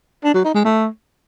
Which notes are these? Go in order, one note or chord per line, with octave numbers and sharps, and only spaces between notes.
D4
F#3
D#4
G#3
A3